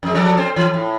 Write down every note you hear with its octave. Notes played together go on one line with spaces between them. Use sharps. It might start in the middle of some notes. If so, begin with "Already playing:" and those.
F2 G#3
F3 A4 D5
C4 C5
E3
A2